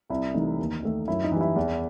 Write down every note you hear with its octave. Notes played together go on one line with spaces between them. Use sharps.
C2 E4
C3 E3 A3 D#4
D#2
D#3 A3
F#2 E4
D#4
E3 G3
E4
E2